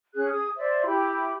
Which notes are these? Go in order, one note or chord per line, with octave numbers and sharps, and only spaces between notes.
C#4 G#4 F#6
G#4 D#6
C5 D5 E5
E4 G4 B5